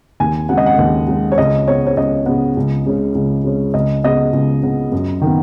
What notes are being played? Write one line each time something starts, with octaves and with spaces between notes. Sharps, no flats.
D#2 G#5
C#3 G#3 F#5
D#5
F#5
D#2
C#3 G#3
C#5
C#2 D#5
C#3 B3 C#5
C#5
C#2 D#5
C#3 B3
C#2
C#3 G#3 C#4
C#2
C#3 G#3 C#4
C#2 D#5
C#3 B3 D#5
C#2
C#3 B3
F#2
D#3
B3